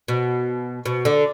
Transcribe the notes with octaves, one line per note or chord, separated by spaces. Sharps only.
B2
B2
D3